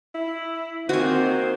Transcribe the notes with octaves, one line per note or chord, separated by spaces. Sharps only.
E4
D#3 A#3 C4 F#4 C5 G#5